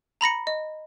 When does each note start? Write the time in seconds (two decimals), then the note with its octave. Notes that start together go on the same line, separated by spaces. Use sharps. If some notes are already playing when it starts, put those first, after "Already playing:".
0.21 A#5 B5 A#6 C#7
0.47 D#5